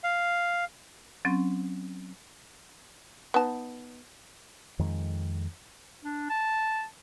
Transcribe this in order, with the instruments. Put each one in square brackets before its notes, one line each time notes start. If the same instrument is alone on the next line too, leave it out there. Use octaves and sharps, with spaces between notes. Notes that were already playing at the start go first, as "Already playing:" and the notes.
[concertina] F5
[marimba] F#3 C4 C#4
[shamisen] B3 D#4 A5
[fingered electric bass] F2 D#3 G#3
[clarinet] D4
A5